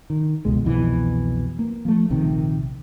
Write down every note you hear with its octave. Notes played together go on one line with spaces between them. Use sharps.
D#3
F1 C#2 B2 G#3
C2 F2 B2 E3
A#3
F3 A3
A#1 C3 D#3